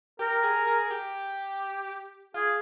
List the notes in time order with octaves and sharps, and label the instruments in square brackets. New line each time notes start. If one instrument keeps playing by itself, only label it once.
[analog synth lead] G4 [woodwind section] A#4
[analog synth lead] G#4
G#4
G4
[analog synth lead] F4 [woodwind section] G#4